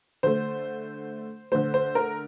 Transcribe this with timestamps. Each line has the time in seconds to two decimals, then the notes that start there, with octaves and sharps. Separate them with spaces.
0.23 D3 A3 C5
1.52 D3 A3 C5
1.74 C5
1.95 A#4